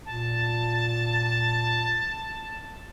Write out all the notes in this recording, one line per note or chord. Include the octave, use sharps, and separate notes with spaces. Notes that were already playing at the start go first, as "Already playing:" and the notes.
A#2 A5